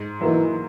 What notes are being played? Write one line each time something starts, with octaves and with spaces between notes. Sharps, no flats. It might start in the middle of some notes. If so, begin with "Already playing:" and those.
Already playing: G#2
E3 F#3 A#3 D#4